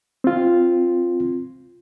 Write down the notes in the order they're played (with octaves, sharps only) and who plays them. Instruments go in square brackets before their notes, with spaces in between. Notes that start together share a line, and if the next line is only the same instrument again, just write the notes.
[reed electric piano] C4 F4